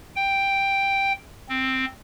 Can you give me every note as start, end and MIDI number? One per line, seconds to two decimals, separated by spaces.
0.16 1.12 79
1.49 1.85 60